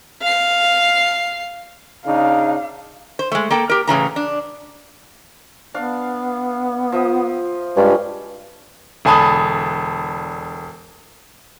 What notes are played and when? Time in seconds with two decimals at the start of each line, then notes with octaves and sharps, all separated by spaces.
0.22 F5 C7
2.06 C#3 D4 D#4 F5
3.19 C5
3.32 G#3 A3
3.51 A#3 A4 G5
3.69 G4 A#4
3.87 A2 C#3 E3 A#5
4.16 D4
5.74 B3 D4 F5
6.92 F3 E5 D#6
7.77 G2 G#3 C#4 F4
9.05 E1 D3 G#5 A5 B5 D#6